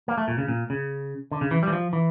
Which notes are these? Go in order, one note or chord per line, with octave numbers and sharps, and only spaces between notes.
A#3
A3
A#2
C#3
A#2
C#3
D3
C#3
E3
G3
E3
F3
E3